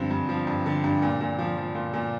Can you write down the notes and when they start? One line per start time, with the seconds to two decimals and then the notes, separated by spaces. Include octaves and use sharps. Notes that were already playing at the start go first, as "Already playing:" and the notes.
Already playing: G2 D3 F3 C4
0.10 G2
0.29 F3
0.47 G2
0.66 D3
0.84 G2
1.02 A#2
1.21 A#2
1.39 F3
1.57 F3
1.75 A#2
1.93 A#2